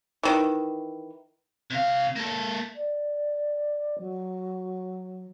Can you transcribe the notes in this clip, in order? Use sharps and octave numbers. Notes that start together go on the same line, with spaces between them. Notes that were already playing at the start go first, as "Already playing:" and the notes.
D#3 E3
C3 F5
A#3 A4
D5
F#3